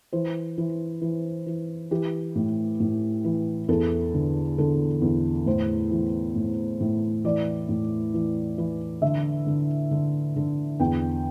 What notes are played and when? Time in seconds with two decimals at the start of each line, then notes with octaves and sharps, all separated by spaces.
0.13 E3 C5
0.58 E3
1.01 E3
1.46 E3
1.91 E3 G4
2.36 A2
2.80 A2
3.24 E3
3.68 E2 A4
4.14 D3
4.58 D3 A4
5.02 E2
5.46 A2 C5
5.91 E3
6.36 A2
6.80 A2
7.24 E3 D5
7.69 A2
8.14 E3
8.58 E3
9.02 D3 E5
9.47 D3
9.91 D3
10.36 D3
10.80 E2 G5